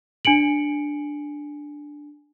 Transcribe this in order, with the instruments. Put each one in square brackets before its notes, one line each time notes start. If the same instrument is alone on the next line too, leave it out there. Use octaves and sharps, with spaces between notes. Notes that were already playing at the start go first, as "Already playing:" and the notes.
[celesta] D4 G#5 C#7 D7 F#7